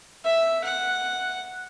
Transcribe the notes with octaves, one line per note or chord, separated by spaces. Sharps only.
E5
F#5